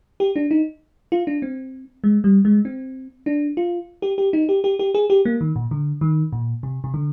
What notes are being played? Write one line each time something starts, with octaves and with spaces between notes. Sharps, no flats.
G4
D4
D#4
F4
D4
C4
G#3
G3
G#3
C4
D4
F4
G4
G4
D#4
G4
G4
G4
G#4
G4
A#3
D#3
A#2
D3
D#3
A#2
C3
C3
D3